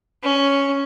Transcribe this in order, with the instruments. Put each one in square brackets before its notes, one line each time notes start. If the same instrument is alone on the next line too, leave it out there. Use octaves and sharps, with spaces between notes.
[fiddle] C#4